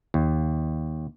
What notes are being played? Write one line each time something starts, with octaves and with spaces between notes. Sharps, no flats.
D#2